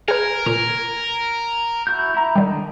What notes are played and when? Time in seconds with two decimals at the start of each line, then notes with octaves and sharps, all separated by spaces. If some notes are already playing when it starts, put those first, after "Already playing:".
0.08 G#4 A#4 B4 G#5
0.46 A#2 A#4
1.87 E4 F#4 G6
2.14 E4 A#5
2.36 D3 D#3 G3 D#4